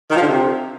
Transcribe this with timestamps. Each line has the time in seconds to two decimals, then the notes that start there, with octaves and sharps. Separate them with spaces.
0.10 D#3
0.16 F3
0.21 D3
0.27 C3